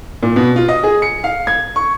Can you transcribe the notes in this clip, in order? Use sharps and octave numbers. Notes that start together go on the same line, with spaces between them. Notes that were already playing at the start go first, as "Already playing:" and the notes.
A#2
B2
F4
D#5
G#4
C#7
F5
G#6
C#6